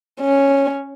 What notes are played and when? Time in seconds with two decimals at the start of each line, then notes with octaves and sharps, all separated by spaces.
0.21 C#4